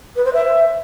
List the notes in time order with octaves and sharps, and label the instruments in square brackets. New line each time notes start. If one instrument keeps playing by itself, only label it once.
[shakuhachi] B4
C5
E5